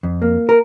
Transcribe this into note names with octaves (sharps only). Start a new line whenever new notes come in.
F2
A#3
A#4